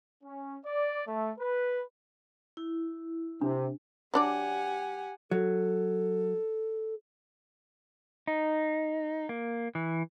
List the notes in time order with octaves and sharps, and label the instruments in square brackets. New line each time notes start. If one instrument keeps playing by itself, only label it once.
[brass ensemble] C#4
D5
A3
B4
[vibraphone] E4
[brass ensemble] C3 [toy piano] D4
[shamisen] F#3 D4 D5 [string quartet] G4 F#5 G#5
[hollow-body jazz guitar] F#3 [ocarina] A4
[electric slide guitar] D#4
A#3
E3